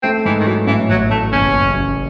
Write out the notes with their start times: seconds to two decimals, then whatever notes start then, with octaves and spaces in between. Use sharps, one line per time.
0.03 A3 C4
0.25 G#2 E3
0.40 D#3
0.46 E3 F#3
0.67 A2 E3
0.89 A1 F#3
1.10 A1 A3
1.32 F#1 C#4
1.53 F#1
1.74 F#2